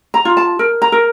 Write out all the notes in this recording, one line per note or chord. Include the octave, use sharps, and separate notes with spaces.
A#5
F4
A5
A#4
A#5
A#4